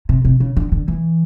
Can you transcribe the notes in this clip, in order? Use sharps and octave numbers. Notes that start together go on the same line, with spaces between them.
C3
C3
C#3
D3
D3
E3